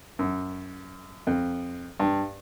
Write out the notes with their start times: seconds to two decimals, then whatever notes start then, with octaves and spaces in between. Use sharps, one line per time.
0.19 F#2
1.27 F2
2.00 G2